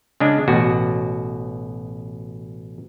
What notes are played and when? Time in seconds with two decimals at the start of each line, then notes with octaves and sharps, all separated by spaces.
0.20 C#3 G#3 D4
0.48 A1 B2 F#4